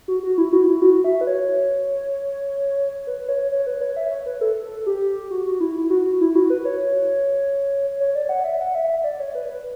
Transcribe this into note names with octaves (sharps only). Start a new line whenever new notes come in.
F#4
F#4
E4
F#4
E4
F#4
E5
B4
C#5
B4
C#5
C#5
B4
C#5
E5
C#5
B4
A4
A4
G4
F#4
F#4
E4
E4
F#4
F#4
E4
F#4
B4
C#5
C#5
D5
F#5
E5
F#5
E5
E5
D5
C#5
B4
B4